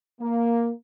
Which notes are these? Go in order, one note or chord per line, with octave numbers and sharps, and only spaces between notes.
A#3